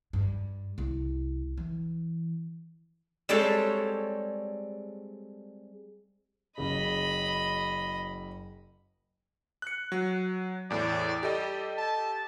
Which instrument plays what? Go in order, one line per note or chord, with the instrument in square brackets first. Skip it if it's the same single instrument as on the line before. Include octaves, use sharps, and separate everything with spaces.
[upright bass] G2
C2
E3
[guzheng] G3 G#3 C4 G4 A4 C#5
[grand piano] F#1 C#3 [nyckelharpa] D#5 B5
[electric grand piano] F#6 C#7
F#3
[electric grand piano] E2 A2 [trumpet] D5
[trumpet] G3 [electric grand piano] G4 A4 D#5
[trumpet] A5